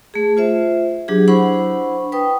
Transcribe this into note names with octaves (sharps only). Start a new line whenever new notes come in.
A3 G#4
F4 C5 E5
F#3 D4 G4 G#4
D4 E4 C5 F#5 B5 C#6
B4 G5 D#6